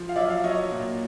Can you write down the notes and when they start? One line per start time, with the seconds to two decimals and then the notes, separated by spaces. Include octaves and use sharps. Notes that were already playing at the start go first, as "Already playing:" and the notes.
Already playing: F3
0.09 F5
0.16 F#3 D5 E5
0.30 F5
0.37 E5
0.44 F#3 C#5 D#5
0.72 A#2